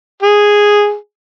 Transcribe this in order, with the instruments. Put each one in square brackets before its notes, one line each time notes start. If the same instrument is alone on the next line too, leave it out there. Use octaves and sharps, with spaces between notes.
[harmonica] G#4